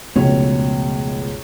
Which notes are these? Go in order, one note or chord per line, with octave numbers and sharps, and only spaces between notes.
F1 C#2 B2 C#5